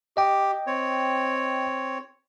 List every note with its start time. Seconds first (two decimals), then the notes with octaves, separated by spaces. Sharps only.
0.17 G4 D#5 G5
0.67 C4 C#5